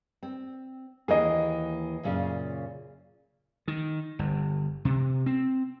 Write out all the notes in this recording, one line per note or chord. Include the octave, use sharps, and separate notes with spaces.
C4
D#2 E3 A#3 G#4 D#5
F#2 A#2 C#3
D#3
G1
C3
C4